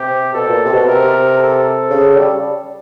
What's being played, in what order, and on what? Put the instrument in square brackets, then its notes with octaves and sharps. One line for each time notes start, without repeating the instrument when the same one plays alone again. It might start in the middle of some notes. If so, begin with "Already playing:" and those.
Already playing: [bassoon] C3 [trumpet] G4
[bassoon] B2 [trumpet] A4
[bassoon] A#2
C3
B2
[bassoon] C3 [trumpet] A#4
[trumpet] A4
[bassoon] C#3
G3